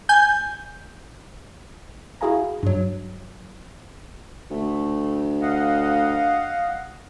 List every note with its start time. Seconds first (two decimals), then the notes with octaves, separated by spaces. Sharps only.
0.09 G#5 G6
2.21 E4 F#4 G#4 F5 G#5 A#5
2.63 G2 F#3
4.51 D2 A3
5.41 D#5 F5 F#5